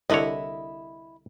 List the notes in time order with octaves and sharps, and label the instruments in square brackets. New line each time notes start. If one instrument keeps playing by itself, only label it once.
[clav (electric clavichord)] C2 D3 C#5 [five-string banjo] E4 D#5